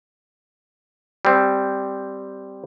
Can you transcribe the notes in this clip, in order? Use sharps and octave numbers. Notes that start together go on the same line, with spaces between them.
G3 C4